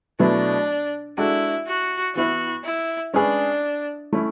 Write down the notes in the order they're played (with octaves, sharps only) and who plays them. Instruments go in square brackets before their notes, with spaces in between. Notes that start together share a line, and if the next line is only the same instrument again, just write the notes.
[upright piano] B2 F#3 A3 E4 B4 [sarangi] D4
[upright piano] G#3 D4 F#4 A4 [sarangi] E4
[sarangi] F#4
[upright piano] E3 B3 E4 B4 [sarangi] F#4
[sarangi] E4
[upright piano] G#3 C#4 G#4 B4 [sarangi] D4
[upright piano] A3 C#4 E4